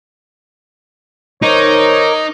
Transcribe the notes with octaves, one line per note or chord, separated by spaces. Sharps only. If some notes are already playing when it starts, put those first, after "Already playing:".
D#3 D#4 A#4 C5 C#5 D6